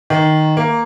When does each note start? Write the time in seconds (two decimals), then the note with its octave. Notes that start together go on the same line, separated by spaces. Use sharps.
0.10 D#3
0.57 A#3